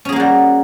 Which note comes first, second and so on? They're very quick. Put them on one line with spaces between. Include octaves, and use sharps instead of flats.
C#4 G#4 A#3 F#4 G3